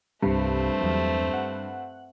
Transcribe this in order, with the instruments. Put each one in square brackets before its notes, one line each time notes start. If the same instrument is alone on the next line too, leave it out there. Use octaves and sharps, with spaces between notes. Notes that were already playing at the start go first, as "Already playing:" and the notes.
[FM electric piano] C2 C3 [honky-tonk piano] G2 [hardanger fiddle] A3 C4
[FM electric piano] E2 F#3
F#5